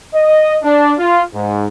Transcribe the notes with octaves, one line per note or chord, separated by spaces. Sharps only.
D#5
D4
F4
G#2